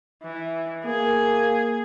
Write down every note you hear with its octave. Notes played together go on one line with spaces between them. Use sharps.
E3
A#3 G#4